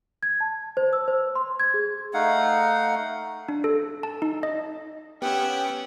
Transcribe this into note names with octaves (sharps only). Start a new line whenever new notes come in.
G#6
A5
C5
E6
C5
C6
G#6
G#4
A3 D#4 F5 F#5
D4
A4
A5
D#4
D#5
B3 C#4 G4 E5 F#5 G5